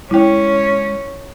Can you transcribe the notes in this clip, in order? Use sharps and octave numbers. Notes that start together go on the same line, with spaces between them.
G#3 C#4 E4 G5